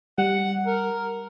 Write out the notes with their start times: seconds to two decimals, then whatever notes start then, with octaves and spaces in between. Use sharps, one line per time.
0.18 G3 F#5
0.67 A#4